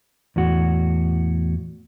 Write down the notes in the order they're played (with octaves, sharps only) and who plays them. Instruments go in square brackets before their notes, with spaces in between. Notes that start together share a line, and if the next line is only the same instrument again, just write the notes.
[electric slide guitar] E2 A2 F#4